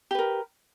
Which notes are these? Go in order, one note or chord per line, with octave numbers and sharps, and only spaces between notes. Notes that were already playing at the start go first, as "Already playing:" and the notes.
G4 A#4 B4